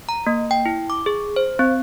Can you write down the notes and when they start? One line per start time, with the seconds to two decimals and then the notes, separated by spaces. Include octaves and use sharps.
0.09 A#5
0.27 A#3
0.51 G5
0.66 E4
0.90 D6
1.06 G#4
1.36 C5
1.59 C4